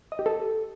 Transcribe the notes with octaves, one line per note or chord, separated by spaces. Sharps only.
D#5
G4
A4